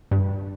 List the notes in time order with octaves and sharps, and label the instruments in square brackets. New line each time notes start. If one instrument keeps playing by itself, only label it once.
[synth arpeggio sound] G2